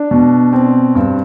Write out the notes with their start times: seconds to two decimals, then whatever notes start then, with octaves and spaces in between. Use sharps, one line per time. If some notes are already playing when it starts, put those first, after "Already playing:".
Already playing: D4
0.11 B2
0.53 C4
0.95 G2